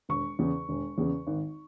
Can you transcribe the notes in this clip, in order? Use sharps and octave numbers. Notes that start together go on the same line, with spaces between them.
E1 C#6
E2 C#3
E1
E2 C#3
G#1